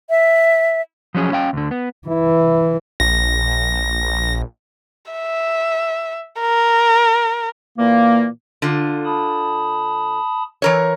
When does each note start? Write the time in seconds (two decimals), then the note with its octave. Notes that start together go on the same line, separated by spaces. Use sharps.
0.10 E5
1.15 F3 F#3 C#4 G#4
1.32 C#4 F5 G5
1.53 D2 D3
1.71 B3
2.08 E3 E4
3.00 A#1 A#6
5.11 E5
6.40 A#4
7.78 A#2 E3 A#3
8.62 D3 F4
9.05 A5 B5 D#6
10.62 E3 A#4 C#5